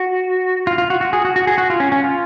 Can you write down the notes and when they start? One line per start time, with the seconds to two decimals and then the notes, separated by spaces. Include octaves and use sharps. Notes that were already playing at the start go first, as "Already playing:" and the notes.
Already playing: F#4
0.67 F4
0.78 F4
0.90 F#4
1.01 F#4
1.13 G#4
1.25 F#4
1.36 F#4
1.47 G#4
1.58 F#4
1.70 F4
1.80 C#4
1.92 C#4
2.04 F4